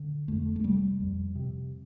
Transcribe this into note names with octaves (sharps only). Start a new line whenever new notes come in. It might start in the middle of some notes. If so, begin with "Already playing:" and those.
Already playing: D3
F2 A3
A3
C3 G3
F2
C3